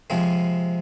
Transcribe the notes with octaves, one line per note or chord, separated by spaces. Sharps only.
C3 F3 G#3 C4